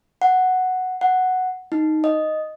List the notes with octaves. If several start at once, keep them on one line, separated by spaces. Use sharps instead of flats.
F#5
F#5
D#4
D#5